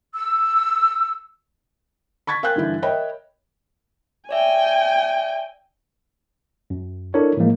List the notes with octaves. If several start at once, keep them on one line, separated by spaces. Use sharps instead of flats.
E6
B5 C#6 G#6 A6 B6
A#4 F5 G5 G#5 F#6 G6
G2 D3 E3 E4
A#4 C#5 D#5 E5 G5 B5
C#5 D5 E5 G5 G#5
F#2
D4 E4 A4 A#4 C#5
A2 E3 F3 G#3 A#3